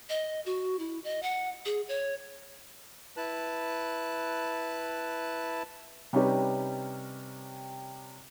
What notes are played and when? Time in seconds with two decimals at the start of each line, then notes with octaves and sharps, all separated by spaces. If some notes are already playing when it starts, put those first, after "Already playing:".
0.09 D#5
0.46 F#4
0.79 E4
1.04 D#5
1.23 F#5
1.65 G#4
1.88 C#5
3.17 E4 B4 A5 F#6
6.13 C3 G3 C#4 D#4 G4 B4